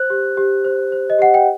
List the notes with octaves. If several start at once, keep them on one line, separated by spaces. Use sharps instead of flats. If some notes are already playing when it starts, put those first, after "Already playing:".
Already playing: C5 F#6
G4
G4
C5
C5
D#5
G4 F#5
G5